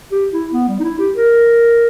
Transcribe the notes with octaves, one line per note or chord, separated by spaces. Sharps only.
G4
E4
B3
G3
D#4
E4
G4
A#4